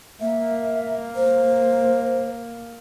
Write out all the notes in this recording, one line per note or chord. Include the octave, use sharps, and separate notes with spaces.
A#3 E5
C5